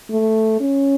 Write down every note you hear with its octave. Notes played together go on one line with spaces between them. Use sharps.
A3
C#4